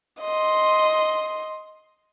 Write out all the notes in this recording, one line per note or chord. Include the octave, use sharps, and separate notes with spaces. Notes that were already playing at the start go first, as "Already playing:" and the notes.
D#5 C6